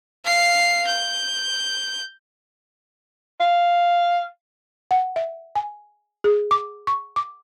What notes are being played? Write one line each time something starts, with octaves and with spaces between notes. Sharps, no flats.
F5 C7
G6
F5
F#5
E5
G#5
G#4
D6
C#6
D6